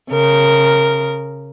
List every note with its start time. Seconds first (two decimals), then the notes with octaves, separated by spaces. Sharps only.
0.10 C#3 A#4